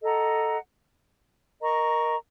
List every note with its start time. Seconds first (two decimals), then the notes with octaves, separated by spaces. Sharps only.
0.02 A4 D#5 F#5 A#5
1.60 A#4 D#5 A#5 C#6